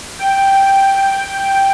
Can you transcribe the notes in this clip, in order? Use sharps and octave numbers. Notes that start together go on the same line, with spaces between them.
G5